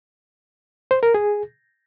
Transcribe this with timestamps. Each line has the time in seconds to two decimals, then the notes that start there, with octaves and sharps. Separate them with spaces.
0.91 C5
1.03 A#4
1.15 G#4